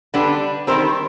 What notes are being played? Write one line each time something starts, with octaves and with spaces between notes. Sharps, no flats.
D3 G3 B3 D4
D#3 G3 C4 A#4 C5